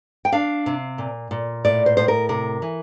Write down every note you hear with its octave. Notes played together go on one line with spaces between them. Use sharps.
G5
D4 F5
C3
A#2
A#2
A2 D5
C5
A2 C5
A#4
C3 A#4
E3